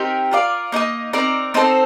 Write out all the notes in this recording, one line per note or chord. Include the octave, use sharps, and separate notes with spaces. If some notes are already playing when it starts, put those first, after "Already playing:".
Already playing: C4 D#4 G4 A#4
F4 A#4 D5 F5
A#3 D#4 A#4 D#5
C4 D#4 A#4 D5
C4 D#4 A4 C5